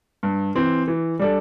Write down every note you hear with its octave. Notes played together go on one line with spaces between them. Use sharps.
G2
E3 C4
E3
G3 D4 A4